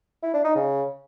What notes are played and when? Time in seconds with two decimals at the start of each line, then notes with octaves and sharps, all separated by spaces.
0.23 E4
0.34 D4
0.44 D#4
0.55 C#3